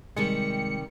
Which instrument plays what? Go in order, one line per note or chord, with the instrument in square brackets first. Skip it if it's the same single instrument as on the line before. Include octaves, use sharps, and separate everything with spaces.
[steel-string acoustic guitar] C3 D#3 G3 [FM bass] G#3 [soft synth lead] C#7